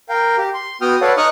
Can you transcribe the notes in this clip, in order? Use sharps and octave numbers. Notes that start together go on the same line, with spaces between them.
A#4 F5 G5
G4
C6
B3 F#4 G5 D#6 F6
A4 B4 C#5 D5 F5 F#5
D#4 C#6 D#6 F6 F#6